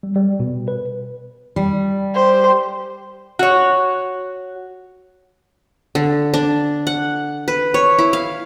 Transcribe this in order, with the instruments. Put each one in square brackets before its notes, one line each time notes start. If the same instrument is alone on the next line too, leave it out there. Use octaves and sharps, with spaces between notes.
[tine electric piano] G3
G3
B2
B4
[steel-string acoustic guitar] G3
[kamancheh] G4 C5
[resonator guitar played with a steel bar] F#4 C#5
[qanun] D3
D4
F#5
B4
C#5
E4
F5